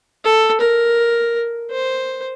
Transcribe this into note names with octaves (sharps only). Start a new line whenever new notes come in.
A4
A#4
C5